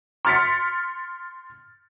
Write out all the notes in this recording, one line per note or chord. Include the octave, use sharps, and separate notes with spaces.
C6 F6 A6 B6 C#7